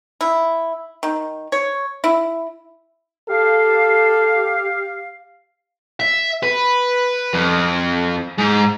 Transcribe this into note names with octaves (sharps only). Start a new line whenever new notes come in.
E4
D#3
C#5
E4
G4 A4 F5
E5
B4
F2
G#2